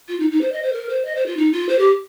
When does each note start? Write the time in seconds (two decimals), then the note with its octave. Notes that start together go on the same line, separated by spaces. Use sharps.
0.09 F4
0.20 D#4
0.31 D#4
0.41 C5
0.52 D#5
0.63 C5
0.73 A#4
0.89 C5
1.05 D#5
1.15 C5
1.26 F4
1.37 D#4
1.53 F4
1.69 C5
1.79 G4